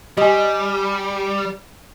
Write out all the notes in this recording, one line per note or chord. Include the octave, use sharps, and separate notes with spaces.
G3 G4 D#5 G#5